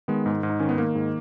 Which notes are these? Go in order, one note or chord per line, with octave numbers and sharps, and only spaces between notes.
D#3 G#3 B3
G#2
G#2
D#4
D#3 C#4
B3
D#3 A#3
G#2